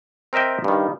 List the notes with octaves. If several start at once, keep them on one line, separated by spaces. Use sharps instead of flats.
C4 A#4 D#5 E5 G5
G2 D#3